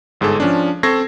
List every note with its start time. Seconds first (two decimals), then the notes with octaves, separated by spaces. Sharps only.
0.21 G1 G#2 G#4 A4 E6
0.40 F3 C#4 D4
0.83 C4 A4 C#6 G#6 A#6 C7